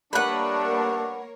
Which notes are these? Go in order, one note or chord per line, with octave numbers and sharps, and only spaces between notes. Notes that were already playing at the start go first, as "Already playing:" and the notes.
G3 A3 A#3 D4 A#4 B4 C#5 F#5